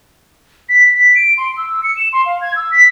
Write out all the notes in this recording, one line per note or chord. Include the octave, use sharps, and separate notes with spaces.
B6
B6
D7
C6
E6
C#7
E7
C6
F5
G#6
E6
B6